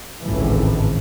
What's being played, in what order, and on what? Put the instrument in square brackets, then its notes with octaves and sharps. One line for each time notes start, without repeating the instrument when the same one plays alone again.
[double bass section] G#1 C#2 A2 E3